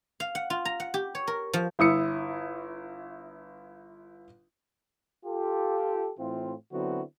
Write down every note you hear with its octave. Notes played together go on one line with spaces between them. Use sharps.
F5
F#5
F4
A#5
F#5
G4
C#5
A#4
F3
G1 E4 D#6 C#7
F4 G4 A4
A2 E3 C4 E4 F4
D3 F#3 B3 C4 E4 F#4